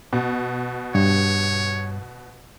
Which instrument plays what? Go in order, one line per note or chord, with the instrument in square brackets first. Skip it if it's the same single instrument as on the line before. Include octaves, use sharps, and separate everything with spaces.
[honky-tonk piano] B2
[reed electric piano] G2 [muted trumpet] C#5